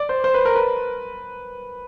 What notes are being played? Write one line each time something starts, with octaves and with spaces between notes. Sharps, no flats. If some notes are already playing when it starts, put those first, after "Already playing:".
Already playing: D5
C5
C5
B4
A#4
B4